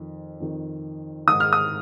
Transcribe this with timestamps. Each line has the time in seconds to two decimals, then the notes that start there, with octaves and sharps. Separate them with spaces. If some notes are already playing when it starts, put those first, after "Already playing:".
Already playing: F2 D#3
0.40 F2 D#3
1.27 G#2 D#3 D#6
1.40 F6
1.53 D#6